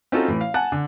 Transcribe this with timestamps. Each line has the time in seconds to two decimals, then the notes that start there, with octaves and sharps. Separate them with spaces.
0.12 C4 C#4 D#4 F4 F#4 A4
0.28 A2 E3
0.41 F5
0.54 F#5 G#5 A5 F#6
0.72 D3